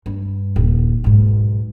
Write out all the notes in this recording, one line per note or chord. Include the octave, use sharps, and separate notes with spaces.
G2
D#1
B1 G#2